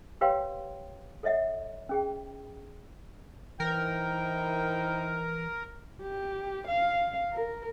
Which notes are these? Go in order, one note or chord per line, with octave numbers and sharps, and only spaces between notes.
G4 B4 C#5 F5 G5 C6
A4 C#5 D#5 E5 F#5
C#4 G#4 G5
E3 D#4 E4 A#4 C5 G5
G4
F5
A#4